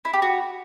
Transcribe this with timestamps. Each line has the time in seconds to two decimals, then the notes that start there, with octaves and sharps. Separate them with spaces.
0.05 E4
0.13 G4
0.22 F#4